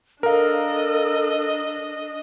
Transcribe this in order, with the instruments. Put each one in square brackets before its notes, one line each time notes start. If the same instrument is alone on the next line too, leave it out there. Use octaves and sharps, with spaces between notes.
[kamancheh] D4 D#5 [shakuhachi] A4 [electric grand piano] A#4 F5